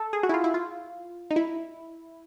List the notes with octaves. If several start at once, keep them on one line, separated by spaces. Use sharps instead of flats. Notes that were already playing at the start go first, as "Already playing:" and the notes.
Already playing: A4
G#4
F#4
E4
F4
E4
F4
D#4
E4